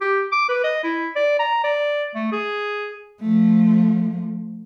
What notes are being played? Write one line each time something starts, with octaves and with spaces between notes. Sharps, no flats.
G4
D6
B4
D#5
E4
D5
A#5
D5
A3
G#4
F3 A3